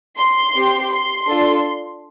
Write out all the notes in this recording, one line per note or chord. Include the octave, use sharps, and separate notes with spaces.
C6
C4 G4
C6
D4 F4 A4